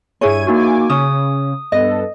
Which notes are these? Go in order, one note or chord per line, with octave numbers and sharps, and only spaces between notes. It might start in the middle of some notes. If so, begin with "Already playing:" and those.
G2 E4 G#4 C#5 G#6 D#7
A#3 D#4 F#4 G#5 D6
C#3 C#4 D#6
G2 B3 A4 D#5